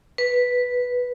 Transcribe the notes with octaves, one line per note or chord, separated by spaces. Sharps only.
B4